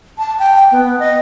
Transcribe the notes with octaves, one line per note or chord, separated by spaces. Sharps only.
A5
G5
B3
D#5